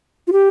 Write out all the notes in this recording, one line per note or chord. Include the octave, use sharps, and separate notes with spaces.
F4
G4